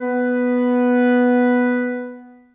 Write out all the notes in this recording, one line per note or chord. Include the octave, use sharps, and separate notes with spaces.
B3 B4